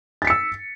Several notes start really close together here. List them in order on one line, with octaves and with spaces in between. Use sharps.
A6 B6 C#7 E6